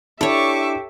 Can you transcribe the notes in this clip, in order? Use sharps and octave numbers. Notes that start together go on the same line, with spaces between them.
D4 E4 G4 A4 C#5 E5 C#6 D6